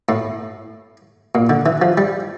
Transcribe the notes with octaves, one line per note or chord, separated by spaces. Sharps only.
A2
A#2
D3
E3
F3
G3